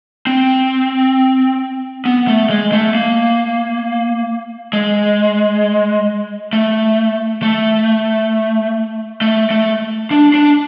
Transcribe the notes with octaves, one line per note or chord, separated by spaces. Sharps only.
C4
B3
A3
G#3
A3
A#3
G#3
A3
A3
A3
A3
D4
D4